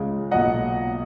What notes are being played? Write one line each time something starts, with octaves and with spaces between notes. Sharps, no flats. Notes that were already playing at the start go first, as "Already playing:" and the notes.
Already playing: C#2 C#3 G#3
B1 A#2 F#3 B3 D#5 F#5